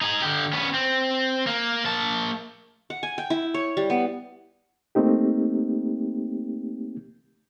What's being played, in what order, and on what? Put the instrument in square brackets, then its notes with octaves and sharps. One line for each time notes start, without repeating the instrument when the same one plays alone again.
[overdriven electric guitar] D#4 G#4
D3 G4
B3 C#4
C4
A#3
A#3 A5
[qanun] F#5
G#5
G5
E4
C#5
G3
B3
[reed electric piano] A3 A#3 C4 D#4 G4